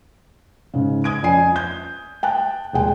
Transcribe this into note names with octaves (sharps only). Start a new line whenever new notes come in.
G#2 C#3
D#6 G#6 D7
F2 C#4 D5 G#5 C7
G6
G5 A5 F#6
D#1 G#3 G5